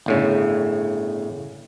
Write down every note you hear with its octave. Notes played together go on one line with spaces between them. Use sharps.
G1 A2 C#3